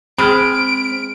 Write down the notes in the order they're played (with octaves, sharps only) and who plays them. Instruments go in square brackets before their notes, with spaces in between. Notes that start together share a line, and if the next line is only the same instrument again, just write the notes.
[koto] G#3 [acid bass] C4 [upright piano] B5 F6 [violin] D7